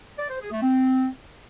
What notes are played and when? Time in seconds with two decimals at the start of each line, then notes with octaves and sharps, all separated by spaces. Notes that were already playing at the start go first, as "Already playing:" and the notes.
0.19 D5
0.30 C5
0.41 G#4
0.52 A3
0.63 C4